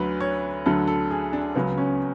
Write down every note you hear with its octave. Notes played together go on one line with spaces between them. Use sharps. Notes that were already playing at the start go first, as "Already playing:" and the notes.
Already playing: D2 D3 F#3 B4
C#5
D2 D3 F#3 A4
A4
G#4
D4
C#2 C#3 F#3 B3
C#4